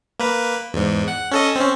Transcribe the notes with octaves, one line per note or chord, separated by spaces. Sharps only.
A#3 B4
E2 G#2
F#5
C#4 A4 D#5
C4 C#4